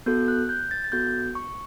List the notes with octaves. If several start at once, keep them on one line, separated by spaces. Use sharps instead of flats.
B3 F#4 A4 G6
F#6
G6
A6
A6
B3 F#4 A4 G6
C#6